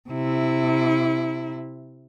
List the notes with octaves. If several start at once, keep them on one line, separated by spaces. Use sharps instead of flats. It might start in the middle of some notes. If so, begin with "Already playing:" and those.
C3 E4